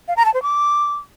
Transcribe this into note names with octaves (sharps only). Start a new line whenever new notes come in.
F5
A#5
A5
C5
D6